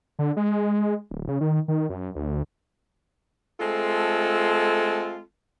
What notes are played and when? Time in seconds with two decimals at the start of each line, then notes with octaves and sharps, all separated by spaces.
0.19 D3
0.37 G#3
1.11 D1
1.28 C#3
1.41 D#3
1.68 D#3
1.89 F#2
2.15 D2
3.60 G#3 A3 C4 F4 A4